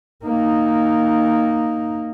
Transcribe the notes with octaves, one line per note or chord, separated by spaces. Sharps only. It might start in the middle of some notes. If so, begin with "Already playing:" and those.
A#3 D#4